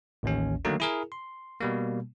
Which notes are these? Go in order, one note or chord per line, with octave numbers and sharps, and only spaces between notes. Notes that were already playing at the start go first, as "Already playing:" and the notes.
A1 D#2 C#4
D3 D#3 F#3 A3 A#3 D#4
E4 G#4 A#4
C6
B2 G3 A#3